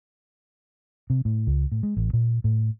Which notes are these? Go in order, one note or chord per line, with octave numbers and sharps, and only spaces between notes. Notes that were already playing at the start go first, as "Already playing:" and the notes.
C3
A2
C#2
A2
G#3
A1
A#2
A2